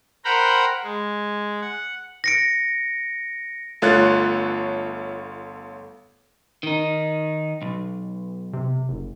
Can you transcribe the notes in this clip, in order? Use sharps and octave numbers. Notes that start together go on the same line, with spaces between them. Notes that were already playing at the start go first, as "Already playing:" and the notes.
A#4 C5 F#5 G5 A#5 B5
G#3
F#5
A#6 C#7 D7
G1 A3 F4 C#5 F#6 A6
D#3 D#4
B1
C3
F#1